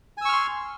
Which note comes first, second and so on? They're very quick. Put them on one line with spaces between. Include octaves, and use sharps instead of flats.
G#5 E6 C#6 F6 C6